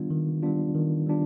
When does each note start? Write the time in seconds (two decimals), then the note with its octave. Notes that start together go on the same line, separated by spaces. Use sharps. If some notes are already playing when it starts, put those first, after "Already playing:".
Already playing: D#3 G3 B3 D4 F4
0.10 D#3
0.43 G3 B3 D4 F4
0.75 D#3
1.07 G3 B3 D4 F4